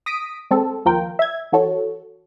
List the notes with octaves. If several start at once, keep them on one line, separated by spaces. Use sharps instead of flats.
D#6 A#6 B6 D7
G#3 C4 A4
D#2 F3 F4 A#4 G5
E5 G#6
E3 F#4 A4 C#5